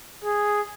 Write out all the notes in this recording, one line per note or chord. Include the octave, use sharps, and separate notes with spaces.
G#4